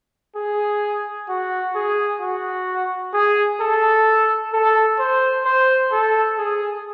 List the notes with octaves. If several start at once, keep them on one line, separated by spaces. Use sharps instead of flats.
G#4
F#4
G#4
F#4
G#4
A4
A4
C5
C5
A4
G#4